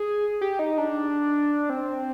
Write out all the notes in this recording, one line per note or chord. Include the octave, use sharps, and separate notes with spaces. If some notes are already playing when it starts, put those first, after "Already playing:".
Already playing: G#4
G4
D#4
D4
C4